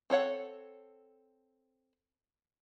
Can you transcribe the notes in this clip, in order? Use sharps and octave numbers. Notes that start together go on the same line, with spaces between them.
C4 A4 C#5 F#5